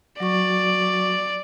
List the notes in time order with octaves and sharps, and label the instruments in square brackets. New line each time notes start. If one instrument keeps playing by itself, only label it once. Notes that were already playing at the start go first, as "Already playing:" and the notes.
[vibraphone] F#3 F#4 C#6 [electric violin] D5